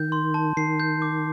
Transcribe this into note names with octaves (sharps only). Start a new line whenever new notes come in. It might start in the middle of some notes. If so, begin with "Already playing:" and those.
Already playing: D#3 G6
C6
A5
D#3 C7
G6
D6